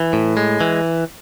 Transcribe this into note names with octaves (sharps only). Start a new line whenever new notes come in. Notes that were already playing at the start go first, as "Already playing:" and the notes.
Already playing: E3
A2
G#3
E3